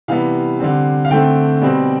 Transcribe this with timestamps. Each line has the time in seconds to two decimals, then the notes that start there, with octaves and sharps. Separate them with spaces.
0.08 C3 E3 G3 B3 F5
0.59 D3 G3 C4
1.05 F5
1.11 D3 A3 C4 G5
1.62 B2 G3 C4